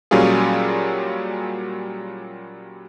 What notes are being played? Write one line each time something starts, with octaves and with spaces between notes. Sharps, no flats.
A#2 F#3 G3 C#4 F4 G#4